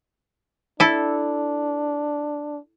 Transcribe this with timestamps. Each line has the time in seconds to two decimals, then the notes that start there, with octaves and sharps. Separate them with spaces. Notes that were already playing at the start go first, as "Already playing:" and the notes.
0.80 D4 E4 A4